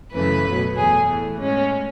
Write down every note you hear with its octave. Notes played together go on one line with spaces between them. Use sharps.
F#2 C#3 E3 A3 B4
B2 F#3 A3
E2 B2 A3 G#4
A2 E3 A3
A2 G#3 C#4